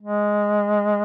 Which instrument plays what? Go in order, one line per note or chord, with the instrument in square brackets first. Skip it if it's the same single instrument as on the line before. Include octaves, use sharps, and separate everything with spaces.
[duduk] G#3